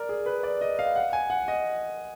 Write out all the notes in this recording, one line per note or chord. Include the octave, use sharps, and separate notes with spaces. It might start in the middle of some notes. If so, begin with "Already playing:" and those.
Already playing: A#4 D5
G#4
B4
D5
D#5
F5
F#5
G#5
F#5
D#5